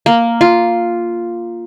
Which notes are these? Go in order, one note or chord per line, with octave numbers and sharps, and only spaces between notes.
A#3
F4